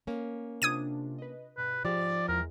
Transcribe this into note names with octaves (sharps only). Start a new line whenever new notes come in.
A#3 C#4
C3 D4 F4 D#6 G#6 D#7
B4 D#5
G2 B2 B4
G#2 F3 G4 D5
E2 G#3 A#4